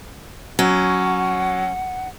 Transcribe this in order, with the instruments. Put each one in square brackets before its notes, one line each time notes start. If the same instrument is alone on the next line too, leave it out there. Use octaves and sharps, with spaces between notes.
[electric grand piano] F#3 [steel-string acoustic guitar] C#4 [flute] F#5